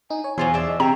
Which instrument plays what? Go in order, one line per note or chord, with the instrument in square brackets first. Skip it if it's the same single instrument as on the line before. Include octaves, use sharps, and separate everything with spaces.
[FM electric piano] D#4 [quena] G#5
[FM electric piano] C#5
[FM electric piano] E2 C6 [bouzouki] F#3 F4 G#4 [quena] C5
[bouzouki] D4 E5 [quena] G#4
[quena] D#5
[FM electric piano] C3 [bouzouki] G#4 E5 [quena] G5 [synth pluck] A#5